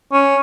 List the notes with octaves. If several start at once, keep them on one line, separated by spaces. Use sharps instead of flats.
C#4